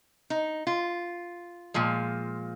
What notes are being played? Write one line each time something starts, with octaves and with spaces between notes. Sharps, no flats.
D#4
F4
A#2 F3 G#3